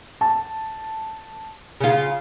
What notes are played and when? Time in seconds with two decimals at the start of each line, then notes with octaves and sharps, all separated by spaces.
0.21 A5
1.80 C#3 F4